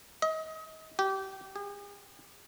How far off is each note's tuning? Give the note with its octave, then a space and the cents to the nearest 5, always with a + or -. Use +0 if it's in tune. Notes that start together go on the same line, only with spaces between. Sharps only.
D#5 +30
G4 -25
G#4 -45